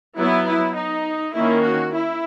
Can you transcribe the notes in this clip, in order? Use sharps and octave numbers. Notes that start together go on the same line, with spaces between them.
F#3 B3 E4
E4
D#4
D#3 A#3 C#4 E4
F#4
E4